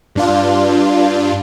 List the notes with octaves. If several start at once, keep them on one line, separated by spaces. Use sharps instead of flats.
G2 D4 F4